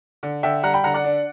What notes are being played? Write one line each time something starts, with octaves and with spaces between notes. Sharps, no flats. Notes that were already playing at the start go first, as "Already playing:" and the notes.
D3
D3 E5 G5
G3 F#5 A#5
G5 B5
D3 F#5 A#5
D5 F#5
D4